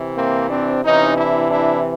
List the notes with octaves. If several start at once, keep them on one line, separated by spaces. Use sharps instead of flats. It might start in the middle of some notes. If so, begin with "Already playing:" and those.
Already playing: C3 E3
A#3 C4
C4 D4
C3 E3 C#4 D#4
D4 E4
D4 E4